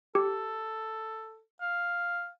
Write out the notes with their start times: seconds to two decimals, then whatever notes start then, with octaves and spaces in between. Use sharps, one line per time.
0.15 G4 A4
1.61 F5